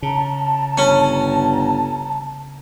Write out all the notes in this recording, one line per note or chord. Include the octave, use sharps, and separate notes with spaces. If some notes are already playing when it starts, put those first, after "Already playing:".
C#3 A5 A#5
G1 C#4